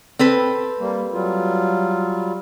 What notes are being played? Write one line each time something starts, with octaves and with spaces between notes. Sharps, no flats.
C4 A4 B4
G3 A#3
F#3 G3 F4